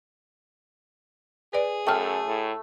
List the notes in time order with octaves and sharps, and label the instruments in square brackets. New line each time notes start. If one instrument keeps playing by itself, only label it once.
[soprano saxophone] G#4 [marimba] B4 D5
[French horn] F#2 [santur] A3 E6 [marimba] G5 F6
[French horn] A2